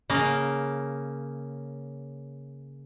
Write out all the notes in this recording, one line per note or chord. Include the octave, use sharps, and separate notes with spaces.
C#3 A#3